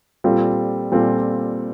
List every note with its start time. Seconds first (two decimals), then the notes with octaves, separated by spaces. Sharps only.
0.24 A#2 G3 C4 F4 A4
0.92 A#2 G3 C4 F4 A4